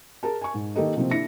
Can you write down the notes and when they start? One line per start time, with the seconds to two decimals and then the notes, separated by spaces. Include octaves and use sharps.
0.23 G#4 A#4 A5
0.41 G#5 C#6
0.54 G#2
0.76 D#3 A#3 G4 A4 A#4 D#5
0.96 C3 F3 A#3 C4
1.11 D4 E4 A#6 C#7